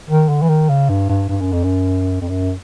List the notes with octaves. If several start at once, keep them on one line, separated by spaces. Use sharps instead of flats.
D#3
D3
E3
D#3
C#3
G2
G2
G2
F#2
F2
F#2
F2
F#2